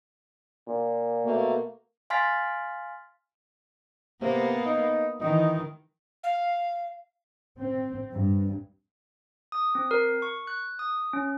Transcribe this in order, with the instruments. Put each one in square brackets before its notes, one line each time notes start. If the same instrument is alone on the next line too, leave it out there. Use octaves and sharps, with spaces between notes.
[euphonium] A#2
[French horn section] B2 A3 A#3
[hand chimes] F5 G#5 C6 F6 A6 B6
[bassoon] C3 [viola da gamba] A#3 B3
[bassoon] D#4
[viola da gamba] D#3 E3 [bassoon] D#4
[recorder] F5
[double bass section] C4
G2
[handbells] D#6
C4
A#4
C#6
F#6
D#6
C#4